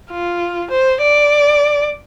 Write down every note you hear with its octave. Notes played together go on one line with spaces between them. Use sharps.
F4
C5
D5